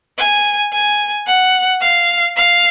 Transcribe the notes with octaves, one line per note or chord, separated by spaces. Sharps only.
G#5
G#5
F#5
F5
F5